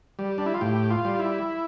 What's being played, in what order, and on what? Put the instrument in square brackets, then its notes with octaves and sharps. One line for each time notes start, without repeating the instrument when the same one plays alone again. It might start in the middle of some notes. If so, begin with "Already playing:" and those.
[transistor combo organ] G3
D4
E4
F4
A2 G4
F4
G3
E4